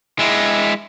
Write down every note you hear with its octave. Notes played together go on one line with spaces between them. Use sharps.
G#3 E4